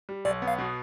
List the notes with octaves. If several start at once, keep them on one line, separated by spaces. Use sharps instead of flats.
G3
B1 D5
B3
F5
B2